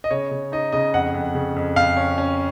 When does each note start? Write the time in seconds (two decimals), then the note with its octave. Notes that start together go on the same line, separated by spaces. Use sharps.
0.04 D#5
0.11 C#3 C#5
0.31 C#3
0.52 D#4 D#5
0.72 C#3 D#5
0.94 F2 F#5
1.14 F2
1.35 C#3
1.56 F2
1.76 F2 F5
1.97 C#4
2.18 C#4